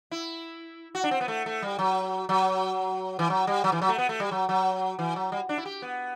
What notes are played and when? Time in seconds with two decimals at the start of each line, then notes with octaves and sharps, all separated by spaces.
0.11 E4
0.95 F#4
1.04 D4
1.11 C4
1.21 B3
1.28 A3
1.46 A3
1.62 G3
1.79 F#3
2.29 F#3
3.19 E3
3.30 F#3
3.47 G3
3.64 F#3
3.72 E3
3.82 F#3
3.89 A3
3.98 B3
4.09 A3
4.20 G3
4.31 F#3
4.49 F#3
4.99 E3
5.16 F#3
5.32 G3
5.49 D4
5.57 E4
5.66 G4
5.82 B3